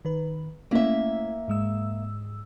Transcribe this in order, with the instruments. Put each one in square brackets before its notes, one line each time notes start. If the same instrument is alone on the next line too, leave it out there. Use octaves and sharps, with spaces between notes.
[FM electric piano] D#3 B4
[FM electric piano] A3 C#4 E4 [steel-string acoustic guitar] A#3 E5
[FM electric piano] G#2 G#3 E6